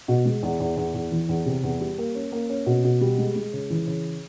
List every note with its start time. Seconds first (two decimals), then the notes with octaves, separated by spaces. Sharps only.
0.08 B2
0.25 G#3
0.43 E2
0.60 E2
0.77 E2
0.94 E2
1.12 E3
1.29 E2
1.46 C3
1.63 E2
1.81 G3
1.98 A#3
2.15 C#4
2.32 A#3
2.50 C#4
2.66 B2
2.84 B2
3.01 G3
3.18 G#3
3.36 G#3
3.53 C#3
3.70 E3
3.87 C#3